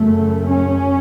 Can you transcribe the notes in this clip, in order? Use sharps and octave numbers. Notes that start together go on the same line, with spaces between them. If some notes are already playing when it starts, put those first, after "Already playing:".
Already playing: F#2 C#3 A3
C#4